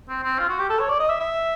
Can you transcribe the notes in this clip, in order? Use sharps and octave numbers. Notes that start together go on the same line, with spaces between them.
C4
C4
F4
F#4
G4
A4
C#5
D5
D#5
E5
E5